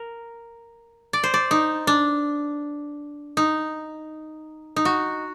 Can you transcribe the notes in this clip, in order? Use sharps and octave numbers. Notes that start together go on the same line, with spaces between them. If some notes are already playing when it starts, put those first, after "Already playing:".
Already playing: A#4
D5
C5
D5
D#4
D4
D#4
D#4
F#4